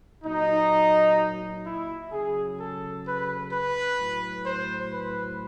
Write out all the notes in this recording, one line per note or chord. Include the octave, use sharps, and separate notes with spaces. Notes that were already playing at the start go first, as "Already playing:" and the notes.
A#2 F#3 D#4
E4
C#3 F#3 G#4
A4
B4
B4
A2 F#3
C5
B4